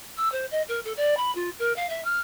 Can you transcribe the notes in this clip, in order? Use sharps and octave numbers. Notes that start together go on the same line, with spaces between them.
E6
C5
D#5
A#4
A4
D5
B5
F4
A#4
F5
E5
F6